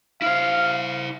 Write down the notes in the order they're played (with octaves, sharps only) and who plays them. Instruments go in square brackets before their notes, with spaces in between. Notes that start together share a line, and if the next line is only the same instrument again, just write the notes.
[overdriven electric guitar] E4 C5 [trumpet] F5